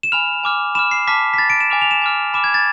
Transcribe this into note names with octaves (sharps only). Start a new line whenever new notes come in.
E7
G#5 B5 F6 F7
G#5 D6 F6
B5 D6 F6 E7
C7
A5 D6 F6 B6
B6
B5 F6 A6
D7
E7
G#5 D6 F6 F7
F7
E7
G#5 D6 F6
B5 D6 F6 E7
G#6
A6